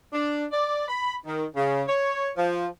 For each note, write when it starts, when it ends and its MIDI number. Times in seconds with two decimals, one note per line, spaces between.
0.12 0.44 62
0.52 0.83 74
0.88 1.14 83
1.26 1.44 51
1.56 1.83 49
1.88 2.30 73
2.37 2.66 53